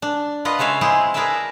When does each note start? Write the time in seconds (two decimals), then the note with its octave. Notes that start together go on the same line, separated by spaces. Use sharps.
0.02 D4
0.45 F4 B4 D#5 F#5
0.59 C#3 G#3 C#5 E5 F5
0.81 G#3 C4 E4 G#4
1.14 G#4 A#4 B4 D5 E5 A5